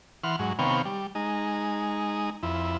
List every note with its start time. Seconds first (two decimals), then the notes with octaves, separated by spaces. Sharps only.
0.24 E3 F#5 C6 F6
0.39 G#2 F#3
0.59 C3 D#3 B3 C#5 F5 G5
0.85 G3
1.15 G#3 D#4
2.43 F2 E4